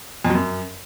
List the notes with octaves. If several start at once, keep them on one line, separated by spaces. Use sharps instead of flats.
F2
F#3
F#2